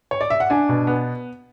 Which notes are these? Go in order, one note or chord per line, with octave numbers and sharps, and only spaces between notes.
C#5
D5
E5
F#5
D4 G#5
B2
B3